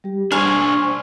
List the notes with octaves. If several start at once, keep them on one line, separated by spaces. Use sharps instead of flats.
G3 G4
D4 C5 G#5 C#6 F6
C5